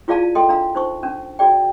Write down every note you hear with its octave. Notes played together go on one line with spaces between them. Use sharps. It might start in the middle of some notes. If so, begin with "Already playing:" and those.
E4 F4 G#4 D5 F5 A5
A4 D#5 G5 C6
D4 F5 A#5
D#4 C5 C#6
C#4 D4
F#4 G#4 D5 G5